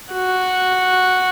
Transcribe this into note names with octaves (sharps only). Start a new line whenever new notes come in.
F#4